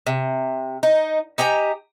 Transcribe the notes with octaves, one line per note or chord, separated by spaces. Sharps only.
C3
D#4
D#4 G4 G#5 A#5